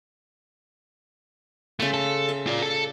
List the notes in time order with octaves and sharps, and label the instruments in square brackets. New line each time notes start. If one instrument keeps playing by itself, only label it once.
[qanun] C#3 F5 C6 [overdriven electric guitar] A3
[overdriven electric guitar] A4
[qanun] E5
[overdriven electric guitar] F4 D5
A4